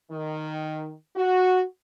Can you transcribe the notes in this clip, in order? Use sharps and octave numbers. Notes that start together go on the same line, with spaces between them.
D#3
F#4